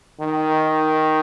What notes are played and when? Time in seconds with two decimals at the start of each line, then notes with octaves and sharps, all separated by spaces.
0.20 D#3